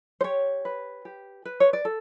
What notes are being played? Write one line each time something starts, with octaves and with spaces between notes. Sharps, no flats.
C5
G4 C#5
B4
G4
B4
C#5
D5
A4